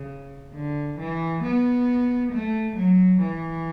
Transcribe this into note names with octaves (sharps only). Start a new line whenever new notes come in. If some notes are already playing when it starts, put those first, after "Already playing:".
Already playing: C#3
D3
E3
B3
A3
F#3
E3